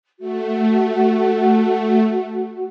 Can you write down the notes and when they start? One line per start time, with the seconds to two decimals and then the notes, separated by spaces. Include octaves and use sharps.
0.19 A3 F#4